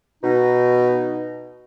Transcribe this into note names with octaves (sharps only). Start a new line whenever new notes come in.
B2 D#4